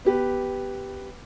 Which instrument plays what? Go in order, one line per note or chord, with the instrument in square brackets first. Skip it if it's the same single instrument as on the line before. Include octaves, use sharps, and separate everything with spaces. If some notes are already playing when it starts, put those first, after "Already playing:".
[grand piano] B3 G4 B4